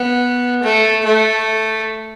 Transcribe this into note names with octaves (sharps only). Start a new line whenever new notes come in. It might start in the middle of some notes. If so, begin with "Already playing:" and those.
Already playing: B3
A3
A3